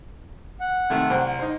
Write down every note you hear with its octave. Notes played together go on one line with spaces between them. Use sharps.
F#5
C3 D#3 A3
C2 C5 G5
D#4 C5